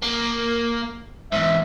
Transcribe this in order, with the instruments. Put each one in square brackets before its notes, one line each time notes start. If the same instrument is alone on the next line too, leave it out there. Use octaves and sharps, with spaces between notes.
[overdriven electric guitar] A#3
[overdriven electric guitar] E2 G#2 [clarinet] E5